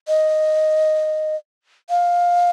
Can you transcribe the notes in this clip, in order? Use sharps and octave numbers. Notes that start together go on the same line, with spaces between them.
D#5
F5